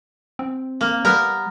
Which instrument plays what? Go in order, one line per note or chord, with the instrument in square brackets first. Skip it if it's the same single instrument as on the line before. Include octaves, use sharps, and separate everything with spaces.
[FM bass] C4
[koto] A#3
[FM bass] G3 [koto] B3 A#4